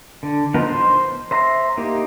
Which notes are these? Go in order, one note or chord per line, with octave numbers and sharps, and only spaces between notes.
D3
F3 B3 D#4 A#4
C5
C5 E5 A#5 C6
A#3 D#4 G4